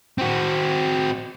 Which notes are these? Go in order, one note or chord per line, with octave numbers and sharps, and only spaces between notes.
C4 F#4